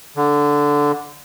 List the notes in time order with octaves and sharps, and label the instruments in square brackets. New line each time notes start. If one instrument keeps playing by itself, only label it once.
[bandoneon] D3